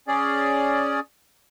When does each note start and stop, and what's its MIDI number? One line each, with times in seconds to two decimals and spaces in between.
0.08 1.00 61
0.08 1.00 68
0.08 1.00 74